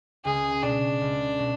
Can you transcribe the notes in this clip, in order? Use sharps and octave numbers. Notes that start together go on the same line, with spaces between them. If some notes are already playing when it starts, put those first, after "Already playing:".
C#2 G#4
B2 G#3 D4
C#2
B2